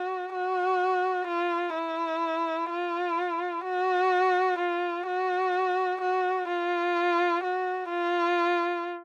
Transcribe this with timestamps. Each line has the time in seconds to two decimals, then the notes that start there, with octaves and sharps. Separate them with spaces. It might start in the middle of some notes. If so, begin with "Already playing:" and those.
Already playing: F#4
0.33 F#4
1.28 F4
1.74 E4
2.70 F4
3.64 F#4
4.58 F4
5.07 F#4
6.01 F#4
6.48 F4
7.43 F#4
7.90 F4